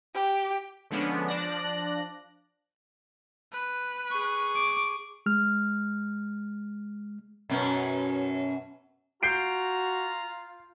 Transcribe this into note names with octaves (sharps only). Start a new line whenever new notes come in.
G4
D3 F3 G#3 B3 C#4 D4
F3 D4 D5 F#6 A#6
B4
G#4 C#6
D6
G#3 F6
F#2 B2 C#4
F4 F#4 A#5 G6 C7 D7